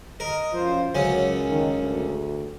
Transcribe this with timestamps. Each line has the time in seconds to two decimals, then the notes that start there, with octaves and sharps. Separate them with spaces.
0.20 A#4 D#5
0.53 F#2 F3 F4 C5
0.95 C#2 F#2 F#3 C#4
1.50 D#3
1.82 D2